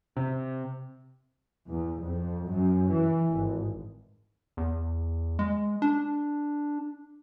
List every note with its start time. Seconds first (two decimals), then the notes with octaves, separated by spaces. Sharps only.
0.17 C3
1.69 E2
2.02 F2
2.46 F#2
2.90 E3
3.32 G#1
4.57 E2
5.39 G#3
5.82 D4